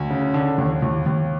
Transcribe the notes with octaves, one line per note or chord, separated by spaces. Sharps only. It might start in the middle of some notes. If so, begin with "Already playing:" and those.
Already playing: D2
C#3
D3
D#2
D#2
D#2